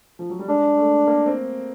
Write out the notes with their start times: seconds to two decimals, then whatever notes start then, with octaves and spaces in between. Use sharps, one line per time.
0.19 F3
0.30 F#3
0.39 G3
0.48 G#3 D4
0.77 A3
1.07 A#3
1.26 C4